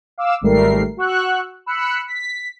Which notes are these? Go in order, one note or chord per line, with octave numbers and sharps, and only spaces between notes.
F5 D6 E6
G#1 G#2 G3 A3 A#4 C7
F#4 F#5 C#6 E6 F#6
B5 E6 F#6 C#7
B6